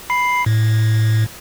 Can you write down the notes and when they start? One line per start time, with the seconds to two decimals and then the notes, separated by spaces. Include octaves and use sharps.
0.10 B5 C7
0.46 A2